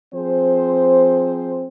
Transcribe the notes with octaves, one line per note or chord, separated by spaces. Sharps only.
F3 C4 G#4 C5